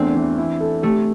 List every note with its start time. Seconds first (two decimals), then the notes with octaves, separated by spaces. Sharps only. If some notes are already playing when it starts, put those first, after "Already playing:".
Already playing: E2 A3 C4 D4
0.15 E3
0.38 E4
0.61 A4
0.83 A3 G4